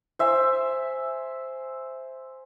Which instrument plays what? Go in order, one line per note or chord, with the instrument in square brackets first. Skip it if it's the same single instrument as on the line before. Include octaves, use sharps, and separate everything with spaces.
[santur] C5 E5 G#5